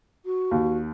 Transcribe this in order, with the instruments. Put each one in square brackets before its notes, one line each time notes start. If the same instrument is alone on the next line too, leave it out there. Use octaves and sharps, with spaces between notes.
[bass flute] F#4
[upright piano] D#2